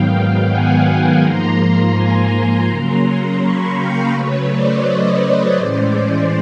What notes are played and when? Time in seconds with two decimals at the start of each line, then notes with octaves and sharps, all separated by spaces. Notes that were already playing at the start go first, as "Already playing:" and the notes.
Already playing: G#2 D#3 F#3 B3 F5 G5
0.49 F#5 G#5
1.22 G#2 F3 A#3 A#5 C6
1.95 G#5 A#5
2.67 C#3 F#3 A#3 C#4 A#5 C6
3.39 B5 C#6
3.75 F5 G5
4.12 C#3 F#3 A3 B4 C#5
4.49 C5 D5
4.85 C#5 D#5
5.57 A2 E3 G#3 C#4 C5 D5